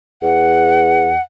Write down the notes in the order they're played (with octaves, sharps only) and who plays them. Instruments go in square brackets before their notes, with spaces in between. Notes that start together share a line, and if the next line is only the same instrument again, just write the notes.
[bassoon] E2 [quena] F#5